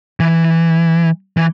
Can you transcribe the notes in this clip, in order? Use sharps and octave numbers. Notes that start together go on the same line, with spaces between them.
E3
E3